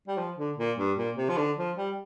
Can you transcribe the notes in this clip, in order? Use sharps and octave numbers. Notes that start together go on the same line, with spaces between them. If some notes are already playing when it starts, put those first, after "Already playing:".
G3
F3
D3
A#2
G2
A#2
C3
F3
D3
F3
G3